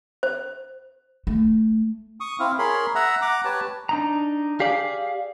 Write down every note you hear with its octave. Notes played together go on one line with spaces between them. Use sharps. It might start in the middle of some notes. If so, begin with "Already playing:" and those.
C5
A3
C#6 D#6
C4 E4 F5
G#4 A#4 C#5 B5 C6
E5 F#5 A#5
F#5 A#5 D6
G4 B4 C#5 A5
D4 D#4 A#5
G4 G#4 D5 F5